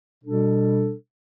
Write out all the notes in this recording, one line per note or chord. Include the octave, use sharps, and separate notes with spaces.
B2 G3 D4 A4